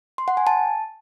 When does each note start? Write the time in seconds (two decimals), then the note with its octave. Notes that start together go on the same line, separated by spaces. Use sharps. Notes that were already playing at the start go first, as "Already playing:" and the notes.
0.18 C6
0.28 F#5
0.37 G#5
0.47 A5